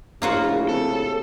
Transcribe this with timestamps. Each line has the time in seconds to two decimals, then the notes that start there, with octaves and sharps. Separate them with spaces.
0.22 A#1 A2 C#3 A#3 F4 F#4
0.69 C3 A4